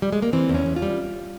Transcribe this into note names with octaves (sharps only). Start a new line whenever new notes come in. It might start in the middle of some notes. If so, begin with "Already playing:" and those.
G3
G#3
A#3
E3 C4
E2
C#4
E2
F4
G3